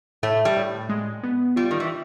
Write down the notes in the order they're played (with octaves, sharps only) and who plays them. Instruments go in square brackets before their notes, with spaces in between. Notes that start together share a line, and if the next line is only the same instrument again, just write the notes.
[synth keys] A2 [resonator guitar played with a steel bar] A3
[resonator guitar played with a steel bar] G3
[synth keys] A2
G#3
B3
[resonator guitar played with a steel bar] G3 [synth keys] F4
[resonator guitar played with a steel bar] D#3
E3